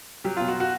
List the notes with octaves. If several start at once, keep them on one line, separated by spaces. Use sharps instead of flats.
F#3 G4
B2 F4
F#4
F#4